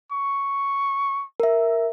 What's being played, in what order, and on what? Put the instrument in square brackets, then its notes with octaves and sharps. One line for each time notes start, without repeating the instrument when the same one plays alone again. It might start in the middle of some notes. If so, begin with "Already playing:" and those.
[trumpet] C#6
[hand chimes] A#4 E5